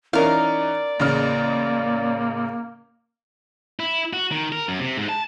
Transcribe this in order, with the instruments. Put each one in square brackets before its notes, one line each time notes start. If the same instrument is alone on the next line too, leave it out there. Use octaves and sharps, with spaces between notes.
[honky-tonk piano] E3 C#4 D#4 [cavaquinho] A#4 F5 [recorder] D5
[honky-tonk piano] A1 C#3 F6 [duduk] A#3
[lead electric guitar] E4
F#4
D#3
A#4
F#2
C3
G#2
A5